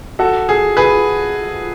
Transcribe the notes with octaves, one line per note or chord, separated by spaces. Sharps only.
F#4 A4
G#4
G#4 B4